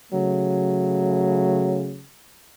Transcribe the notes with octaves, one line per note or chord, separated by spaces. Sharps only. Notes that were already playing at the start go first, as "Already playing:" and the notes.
C#3 F#3 A3